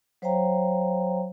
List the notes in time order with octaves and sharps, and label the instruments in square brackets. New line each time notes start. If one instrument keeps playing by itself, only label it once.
[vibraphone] F#3 C5 C#5 F5 G5 A#5